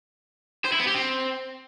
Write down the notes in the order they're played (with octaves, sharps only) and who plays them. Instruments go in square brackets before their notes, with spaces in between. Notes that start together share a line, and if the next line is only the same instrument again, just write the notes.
[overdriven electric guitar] C5
E4
B3
G4
C4